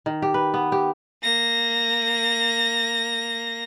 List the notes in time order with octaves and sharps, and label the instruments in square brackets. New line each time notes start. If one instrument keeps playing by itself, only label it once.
[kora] D#3
G4
B4
B3
G4
[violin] A#3 A#6